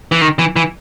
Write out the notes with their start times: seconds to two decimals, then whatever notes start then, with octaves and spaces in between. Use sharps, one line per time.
0.12 E3
0.21 D#3
0.39 E3
0.56 E3